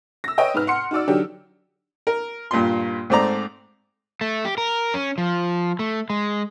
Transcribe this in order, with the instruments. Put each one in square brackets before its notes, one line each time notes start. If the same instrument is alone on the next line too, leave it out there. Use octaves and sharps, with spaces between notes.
[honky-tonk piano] E6 A#6
B4 C#5 D#5 G5
G#2 B4 F6
F#5 C6 C#7
D#4 F#4 D5 E6
D3 F#3 D4 D#4 G4
[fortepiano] A#4
G2 A#2 F4 C6
G#2 A3 C4 D5 A#5
[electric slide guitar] A3
G4
A#4
C#4
F3
A3
G#3